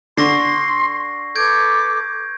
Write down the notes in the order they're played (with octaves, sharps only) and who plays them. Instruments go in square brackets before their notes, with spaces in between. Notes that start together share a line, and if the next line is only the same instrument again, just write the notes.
[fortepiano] D3 [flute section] C6 [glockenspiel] C#6 A#6 C7
[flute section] A4 B4 D6 [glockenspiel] G6 G#6 D7